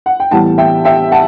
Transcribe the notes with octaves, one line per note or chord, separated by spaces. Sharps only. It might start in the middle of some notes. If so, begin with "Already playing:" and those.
F#5
G5
A2 E3 G3 B3 F#5 A5
E5 G5
E5 G5
F#5 A5